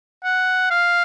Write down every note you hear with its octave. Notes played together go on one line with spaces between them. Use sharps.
F#5
F5